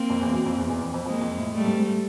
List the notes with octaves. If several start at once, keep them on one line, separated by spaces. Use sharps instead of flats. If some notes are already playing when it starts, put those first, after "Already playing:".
Already playing: A#3 C4
F2
E2
F#2
F2
E2
E2
F2
F2
F2 G#3 A#3
F2
A2
A2 G3 A3
G#2
G#2